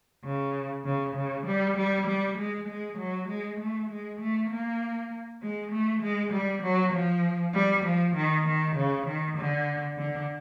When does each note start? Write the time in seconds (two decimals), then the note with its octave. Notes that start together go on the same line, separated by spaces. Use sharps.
0.24 C#3
0.84 C#3
1.16 C#3
1.46 G3
1.77 G3
2.07 G3
2.37 G#3
2.68 G#3
2.98 F#3
3.28 G#3
3.59 A3
3.90 G#3
4.20 A3
4.50 A#3
5.42 G#3
5.71 A3
6.02 G#3
6.33 G3
6.63 F#3
6.93 F3
7.54 G3
7.85 F3
8.16 D#3
8.46 D#3
8.76 C#3
9.06 D#3
9.38 D3
9.98 D3